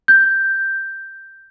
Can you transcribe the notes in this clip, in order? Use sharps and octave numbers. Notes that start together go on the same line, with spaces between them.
G6